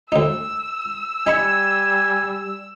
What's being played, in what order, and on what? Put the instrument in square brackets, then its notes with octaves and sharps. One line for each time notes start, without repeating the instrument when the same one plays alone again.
[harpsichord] D2 D#4 [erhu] E6
[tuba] G3 [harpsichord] D#4 B5 C#6 [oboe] G#5